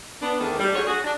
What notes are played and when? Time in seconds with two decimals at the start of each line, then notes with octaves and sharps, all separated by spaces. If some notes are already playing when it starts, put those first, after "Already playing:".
0.21 B3 D4
0.40 E2 G#2 D#3 A3 D4
0.59 G3
0.75 D2 D3 F#4 G#4 C#5
0.87 F#4 G#4
1.04 D4